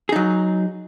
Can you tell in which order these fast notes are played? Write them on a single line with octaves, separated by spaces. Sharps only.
G#4 D#4 F#3